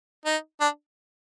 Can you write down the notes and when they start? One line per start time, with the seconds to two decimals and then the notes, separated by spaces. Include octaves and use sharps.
0.26 D#4
0.61 D4